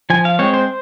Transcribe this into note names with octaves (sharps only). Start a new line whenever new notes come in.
F3 G#5
F5
G#3 C4 C#5
C5